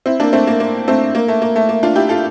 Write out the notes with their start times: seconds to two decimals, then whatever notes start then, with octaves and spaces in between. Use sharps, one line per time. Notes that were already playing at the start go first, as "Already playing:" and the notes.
0.06 C4 E4
0.20 A#3 D4
0.33 A3 C4
0.47 A#3
0.60 A#3
0.88 A3 C4
1.15 A#3
1.28 A3
1.42 A#3
1.56 A3
1.69 A#3
1.83 D4 F4
1.96 E4 G4
2.09 F4 A4